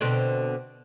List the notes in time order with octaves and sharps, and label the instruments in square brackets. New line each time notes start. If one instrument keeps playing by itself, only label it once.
[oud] B2 D3 C4